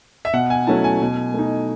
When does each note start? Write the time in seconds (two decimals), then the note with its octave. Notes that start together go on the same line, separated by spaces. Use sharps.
0.25 E5
0.33 B2 F#5
0.50 G#5
0.67 F#3 A3 C#4 E4 A5
0.84 G#5
1.01 B2
1.34 A3 D#4